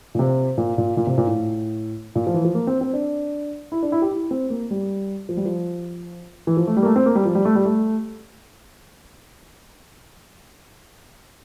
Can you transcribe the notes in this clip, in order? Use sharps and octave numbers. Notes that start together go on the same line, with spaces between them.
A#2
C3
A#2
A#2
A#2
C3
A#2
A2
A#2
F3
E3
F3
A#3
C4
C4
D4
E4
D4
E4
G4
E4
C4
A#3
G3
F3
G3
F3
E3
F3
A3
G3
A#3
A3
C4
A#3
G3
F3
G3
A3
G3
A3